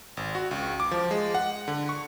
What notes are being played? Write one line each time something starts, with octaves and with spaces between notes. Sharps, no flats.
G#1
F#4
C#2
D6
F3
G#3
F#5
D3
C#6